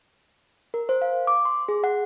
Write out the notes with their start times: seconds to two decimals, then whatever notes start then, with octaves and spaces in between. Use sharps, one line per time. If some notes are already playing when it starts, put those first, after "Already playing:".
0.74 A#4
0.89 C5
1.02 F5
1.27 D6
1.45 C6
1.68 G#4
1.84 F#5